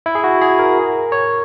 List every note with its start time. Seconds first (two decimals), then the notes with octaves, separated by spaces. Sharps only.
0.06 E4
0.15 G#4
0.24 F#4
0.41 G#4
0.59 A#4
1.12 C#5